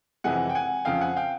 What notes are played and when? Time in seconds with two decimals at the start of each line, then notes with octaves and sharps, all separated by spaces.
0.24 F2 C3 E3 G#3 F#5 G#5
0.49 G5
0.55 F#5 G#5
0.85 F2 C#3 F3 F5 G5
1.01 F#5 G#5
1.16 F5 G5